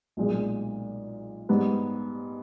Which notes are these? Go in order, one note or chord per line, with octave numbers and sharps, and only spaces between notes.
B1 A#2 G#3
G#2 G3 B3